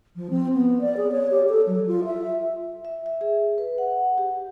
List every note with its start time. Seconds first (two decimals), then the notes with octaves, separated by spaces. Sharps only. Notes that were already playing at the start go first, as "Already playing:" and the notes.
0.16 F3
0.30 C4
0.54 B3
0.81 D5
0.97 G#4
1.11 C#5
1.31 G4
1.49 A4
1.66 F#3
1.87 F4
2.05 E5
2.85 E5
3.06 E5
3.21 G#4
3.58 B4
3.78 F#5
4.18 G4